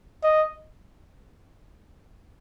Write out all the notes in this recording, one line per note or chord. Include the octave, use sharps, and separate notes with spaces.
D#5